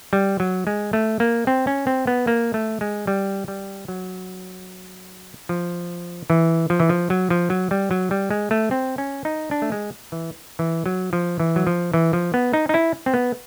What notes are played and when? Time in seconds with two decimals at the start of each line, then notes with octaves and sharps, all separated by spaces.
0.13 G3
0.40 F#3
0.67 G#3
0.93 A3
1.20 A#3
1.47 C4
1.67 C#4
1.87 C4
2.07 B3
2.27 A#3
2.54 A3
2.81 G#3
3.07 G3
3.48 G3
3.88 F#3
5.49 F3
6.30 E3
6.70 F3
6.80 E3
6.89 F3
7.10 F#3
7.30 F3
7.50 F#3
7.71 G3
7.91 F#3
8.11 G3
8.31 G#3
8.51 A3
8.71 C4
8.98 C#4
9.25 D#4
9.51 D4
9.62 A3
9.72 G#3
10.12 E3
10.59 E3
10.86 F#3
11.13 F3
11.40 E3
11.56 F#3
11.67 F3
11.93 E3
12.13 F3
12.34 B3
12.53 D#4
12.69 D#4
12.74 E4
13.06 C4
13.14 B3